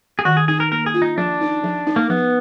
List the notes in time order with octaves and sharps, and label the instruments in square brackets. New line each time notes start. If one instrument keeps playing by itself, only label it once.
[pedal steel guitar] G#4
[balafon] D#3 [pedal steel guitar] F#4
[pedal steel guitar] G#4
[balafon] D#4 [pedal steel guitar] G#4
[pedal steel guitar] A#4
[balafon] A#3 [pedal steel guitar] A#4
[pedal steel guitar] G#4
[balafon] F4
[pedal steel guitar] D#4
[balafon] F3 [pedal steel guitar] D4
[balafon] D#4
F3
D#4
[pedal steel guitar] A#3
[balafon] F3 [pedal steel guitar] B3